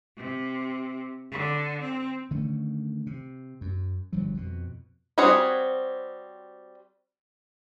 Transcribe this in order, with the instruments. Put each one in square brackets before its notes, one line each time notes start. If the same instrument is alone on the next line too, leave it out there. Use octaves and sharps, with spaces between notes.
[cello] C3
D3
C4
[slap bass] D3 D#3 A3 C#4
C3
F#2
G1 G2 F3 F#3
F2 B2
[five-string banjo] G3 C4 F#4 G#4 C#5